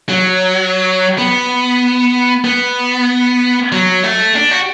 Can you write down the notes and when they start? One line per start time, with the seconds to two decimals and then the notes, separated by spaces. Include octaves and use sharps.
0.09 F#3
1.18 B3
2.45 B3
3.72 F#3
4.03 A3
4.36 D4
4.51 F#4